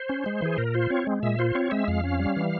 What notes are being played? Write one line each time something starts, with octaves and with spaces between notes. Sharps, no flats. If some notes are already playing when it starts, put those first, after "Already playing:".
Already playing: C5
C#4
G#3
E3 G#4
A#2 A#4
F4 C5
C4 C#5
G#3
A#2 E5
F4 C5
C4 C#5
G#3 E5
F2 F5
C#4
G3
E3